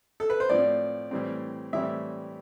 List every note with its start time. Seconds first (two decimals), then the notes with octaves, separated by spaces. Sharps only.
0.20 A4
0.30 B4
0.40 C5
0.49 A2 F3 C4 D5
1.11 A2 E3 G3 C4
1.73 A2 E3 G3 C4 E5